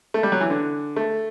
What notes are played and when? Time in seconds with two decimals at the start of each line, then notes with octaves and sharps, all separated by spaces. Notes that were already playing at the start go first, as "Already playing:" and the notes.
0.14 A3
0.23 G3
0.32 F#3
0.41 E3
0.50 D3
0.97 A3